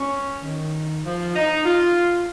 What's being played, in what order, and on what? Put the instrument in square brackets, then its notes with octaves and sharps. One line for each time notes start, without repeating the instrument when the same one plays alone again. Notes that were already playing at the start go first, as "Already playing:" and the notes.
Already playing: [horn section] C#4
D#3
F3
D#4
F4